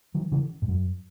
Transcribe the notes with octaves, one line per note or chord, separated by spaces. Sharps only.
D#3 F#3
C#3 E3
G#2
F#2